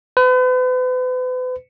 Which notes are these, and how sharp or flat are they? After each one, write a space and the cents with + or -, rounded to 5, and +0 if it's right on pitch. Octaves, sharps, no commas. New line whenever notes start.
B4 +40